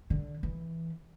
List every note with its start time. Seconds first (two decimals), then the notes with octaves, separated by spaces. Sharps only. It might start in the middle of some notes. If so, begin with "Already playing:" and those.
0.10 D3
0.43 E3